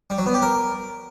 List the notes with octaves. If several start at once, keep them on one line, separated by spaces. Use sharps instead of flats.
G3
F#3
B3
G4
A#4